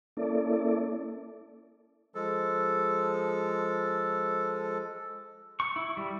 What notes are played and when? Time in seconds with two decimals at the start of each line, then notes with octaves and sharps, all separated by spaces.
0.17 A#3 C#4 E4 A4 D5
2.15 F3 G#3 A4
5.60 C#6
5.76 E4
5.97 G3